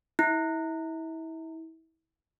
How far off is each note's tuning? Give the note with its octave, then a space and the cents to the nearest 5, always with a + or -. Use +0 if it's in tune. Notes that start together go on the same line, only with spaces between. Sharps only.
E4 -30